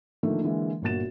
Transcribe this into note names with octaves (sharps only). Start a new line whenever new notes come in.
D3 D#3 F3 A3 A#3
D3 E3 G#3 A#3
G1 A#2 A#3 F#4 A6 E7